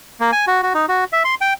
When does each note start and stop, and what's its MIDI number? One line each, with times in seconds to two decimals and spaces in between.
0.20 0.31 58
0.32 0.45 80
0.47 0.61 66
0.63 0.73 66
0.74 0.86 63
0.89 1.04 66
1.13 1.23 76
1.24 1.35 84
1.41 1.53 79